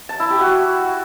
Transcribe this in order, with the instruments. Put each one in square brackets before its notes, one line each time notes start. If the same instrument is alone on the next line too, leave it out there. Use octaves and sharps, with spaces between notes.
[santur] A5
E4
G4
F#4